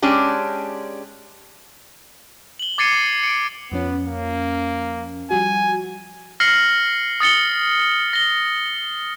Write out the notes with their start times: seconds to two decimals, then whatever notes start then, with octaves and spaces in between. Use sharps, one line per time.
0.02 G#3 C#4 D4 G4
2.59 F#7 G7
2.78 D6 G#6 A6 C7 C#7 D#7
3.23 C#7 D7
3.72 F2 F3 B3 C#4
4.06 A#3
5.31 F3 G3 F#4 G#5
6.40 F6 A#6 C7 C#7 F#7
7.20 D#6 A6 C#7 G7
8.13 A#6 G7